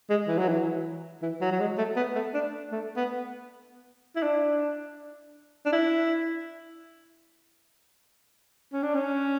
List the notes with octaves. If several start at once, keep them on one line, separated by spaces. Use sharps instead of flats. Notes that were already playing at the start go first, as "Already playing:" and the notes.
G#3
E3
F#3
E3
E3
F#3
F#3
G#3
A3
B3
A3
D4
A3
B3
E4
D4
D4
E4
C#4
D4
C#4